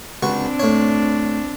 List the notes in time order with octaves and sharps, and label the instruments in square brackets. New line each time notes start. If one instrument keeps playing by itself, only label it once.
[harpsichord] C#2 F#4 C#6 [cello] C4 D4
[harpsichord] A2 C#5